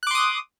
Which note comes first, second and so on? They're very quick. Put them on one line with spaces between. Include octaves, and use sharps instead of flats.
F#6 D6 C6 D#6